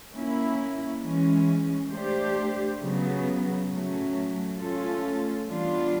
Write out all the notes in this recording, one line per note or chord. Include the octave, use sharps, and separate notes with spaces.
A#3 C#4 E4
E3 G#3 C#4
A3 D4 G4 C5
C#3 F#3 B3
A2 F#3 A3 C#4
A3 C#4 F4 A4
E3 G3 B3 D4 F4